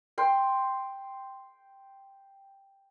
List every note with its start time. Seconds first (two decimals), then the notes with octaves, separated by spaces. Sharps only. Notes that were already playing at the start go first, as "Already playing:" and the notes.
0.18 G5 C6